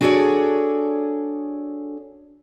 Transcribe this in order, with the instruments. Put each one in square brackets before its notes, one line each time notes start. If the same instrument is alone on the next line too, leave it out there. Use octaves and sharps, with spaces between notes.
[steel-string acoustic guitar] D4 F#4 G#4 A4 C#5 D5